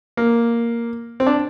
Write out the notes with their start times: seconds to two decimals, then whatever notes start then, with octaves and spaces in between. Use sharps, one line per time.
0.17 A#3
1.20 C4
1.27 D4